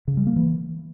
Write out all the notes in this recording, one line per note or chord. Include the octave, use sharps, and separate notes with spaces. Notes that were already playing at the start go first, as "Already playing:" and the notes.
C#3
G3
A#3
E3